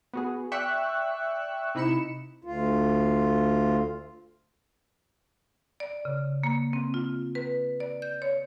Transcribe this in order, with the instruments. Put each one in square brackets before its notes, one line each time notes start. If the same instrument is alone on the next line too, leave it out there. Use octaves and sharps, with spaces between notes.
[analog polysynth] B3 F#4 G#4
D5 E5 G5 C#6 E6 F#6
C3 D#4 E4 B5 C#7 E7
[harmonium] D2 F4
[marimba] D5
C#3
A#3
C4
F4
B4
D5
G6
C#5